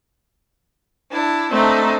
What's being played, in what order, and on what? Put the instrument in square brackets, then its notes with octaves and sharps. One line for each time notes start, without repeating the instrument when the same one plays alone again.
[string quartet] D4 E4
[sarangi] A3 [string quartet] C4 D4 D#4